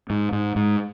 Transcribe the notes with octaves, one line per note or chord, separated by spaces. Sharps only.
G#2
G#2
G#2